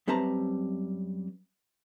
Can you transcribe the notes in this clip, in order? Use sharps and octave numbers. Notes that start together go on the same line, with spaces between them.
F#2 G3 C4 B4 A5 A#5